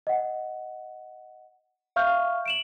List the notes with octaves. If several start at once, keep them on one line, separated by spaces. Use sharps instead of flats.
D#5 F#5
E5 F5 C#6 F6 G6
D7 E7 F#7